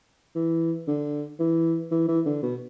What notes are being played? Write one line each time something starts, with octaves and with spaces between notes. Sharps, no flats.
E3
D3
E3
E3
E3
D3
B2